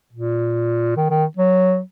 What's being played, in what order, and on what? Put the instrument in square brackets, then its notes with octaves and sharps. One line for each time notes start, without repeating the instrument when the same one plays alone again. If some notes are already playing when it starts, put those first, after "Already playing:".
[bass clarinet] A#2
D#3
D#3
F#3